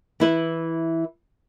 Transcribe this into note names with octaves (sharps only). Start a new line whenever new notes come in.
E3 E4 B4